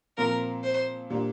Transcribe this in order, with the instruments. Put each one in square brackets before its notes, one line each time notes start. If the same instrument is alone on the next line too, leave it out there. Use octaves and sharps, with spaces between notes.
[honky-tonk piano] A#2 F3 C4 F4 [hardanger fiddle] A#4
[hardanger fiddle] C5
[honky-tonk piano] A#2 G3 A#3 D4 F4